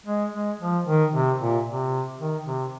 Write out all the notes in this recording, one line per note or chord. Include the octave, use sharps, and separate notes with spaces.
G#3
G#3
F3
D#3
C3
A#2
C3
D#3
C3